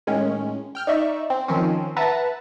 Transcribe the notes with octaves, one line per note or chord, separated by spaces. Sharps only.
A2 D#3 G#3 C#4
G5 F6 G6
D#4 D5 E5 C#6
C4
D#3 F3 C4 C#4
B4 E5 F#5 A5 A#5 A6